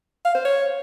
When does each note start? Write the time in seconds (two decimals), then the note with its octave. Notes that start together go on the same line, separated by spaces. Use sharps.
0.25 F5
0.35 C5
0.45 C#5